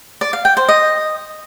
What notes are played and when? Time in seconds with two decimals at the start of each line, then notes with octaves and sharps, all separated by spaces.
0.21 D5
0.33 F5
0.45 G5
0.57 C5
0.68 D#5